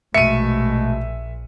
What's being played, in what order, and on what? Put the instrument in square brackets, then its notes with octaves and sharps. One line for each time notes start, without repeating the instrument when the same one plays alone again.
[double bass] A#1 [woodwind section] B2 G#3 A3 [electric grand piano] E5 [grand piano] C#7 D#7